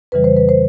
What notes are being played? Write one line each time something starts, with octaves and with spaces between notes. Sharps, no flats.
F2 C#3 E3 G3 B4
C5
B4
C5